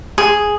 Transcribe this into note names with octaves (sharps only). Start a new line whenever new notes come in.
G#4